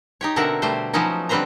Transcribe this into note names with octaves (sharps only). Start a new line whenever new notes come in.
D#4 G4 C#5
B2 D3 C4 A#4 E5 F#5
B2 G3 A3 G4 C5
F3 F#3 B3 C#4 D#4
D3 G3 C4 B4 C5 A#5